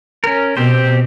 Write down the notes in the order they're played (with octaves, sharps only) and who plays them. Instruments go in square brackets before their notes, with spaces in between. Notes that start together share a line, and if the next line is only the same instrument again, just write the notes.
[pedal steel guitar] C#4 A#4
[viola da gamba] B2 [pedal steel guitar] C4 G4 C5